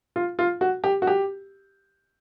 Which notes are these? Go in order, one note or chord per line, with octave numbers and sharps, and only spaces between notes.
F4
F4
F#4
G4
F#4
G4